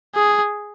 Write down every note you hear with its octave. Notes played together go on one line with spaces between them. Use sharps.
G#4